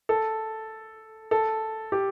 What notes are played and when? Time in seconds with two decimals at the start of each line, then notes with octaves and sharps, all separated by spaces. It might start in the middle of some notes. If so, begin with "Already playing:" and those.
0.09 A4
1.31 A4
1.92 G4